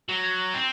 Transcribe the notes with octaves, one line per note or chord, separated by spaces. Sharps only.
F#3
C4